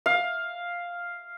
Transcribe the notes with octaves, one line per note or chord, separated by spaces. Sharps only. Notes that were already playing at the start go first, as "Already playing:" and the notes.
F5